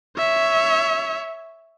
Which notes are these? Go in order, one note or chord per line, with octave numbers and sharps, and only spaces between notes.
C#5 E5